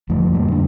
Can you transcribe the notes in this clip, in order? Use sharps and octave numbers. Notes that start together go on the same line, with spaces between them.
F2 D3 F3 A3
G3 A#3
D4